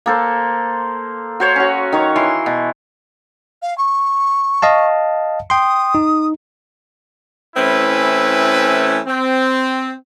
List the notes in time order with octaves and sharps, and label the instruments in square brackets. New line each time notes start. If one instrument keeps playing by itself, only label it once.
[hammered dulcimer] A#3 A4 C5
F#4 C5 C#5
C#4 F#4
D#3 C#5
E3 C6
B2
[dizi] F5
C#6
[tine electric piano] D#5 F5 A5
[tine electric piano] G5 C6 [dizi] D#6
[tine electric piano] D#4
[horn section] E3 A3 C4 C#4 E4 B4
C4